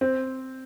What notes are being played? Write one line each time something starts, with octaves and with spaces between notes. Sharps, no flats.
C4